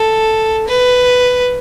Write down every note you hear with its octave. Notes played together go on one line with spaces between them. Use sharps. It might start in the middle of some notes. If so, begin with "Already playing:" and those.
Already playing: A4
B4